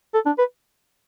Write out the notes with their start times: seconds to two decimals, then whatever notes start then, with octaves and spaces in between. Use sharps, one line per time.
0.14 A4
0.26 D4
0.38 B4